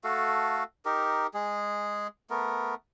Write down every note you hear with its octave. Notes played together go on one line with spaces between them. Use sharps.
A3 F#4 A4 F5
D#4 G4 A#4
G#3 G#4
A3 B3 A#4